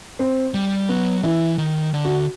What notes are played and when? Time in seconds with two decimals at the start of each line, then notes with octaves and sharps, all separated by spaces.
0.19 C4
0.54 G3
0.89 F#3 B3
1.23 E3 E4
1.58 D#3
1.94 D3
2.05 F#4